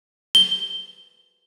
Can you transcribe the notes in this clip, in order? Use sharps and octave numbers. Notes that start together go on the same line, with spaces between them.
G7